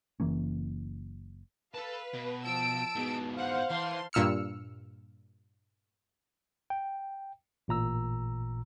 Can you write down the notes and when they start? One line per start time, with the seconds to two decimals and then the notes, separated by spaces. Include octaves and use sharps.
0.20 F#1 E3 A#3 C#4
1.74 A4 B4 F5 A5
2.14 B2
2.45 F3 A5 E6 D7
2.96 G#2 B2 B3 G#4
3.38 C5 F5 F#5
3.70 E3 A5 C6
4.13 G2 A#2 E6 F6 C#7
6.70 G5
7.68 A1 A#2 A#5 E6